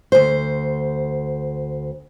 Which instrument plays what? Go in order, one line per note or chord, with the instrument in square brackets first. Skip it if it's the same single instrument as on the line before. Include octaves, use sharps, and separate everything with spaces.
[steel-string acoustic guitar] D2 C5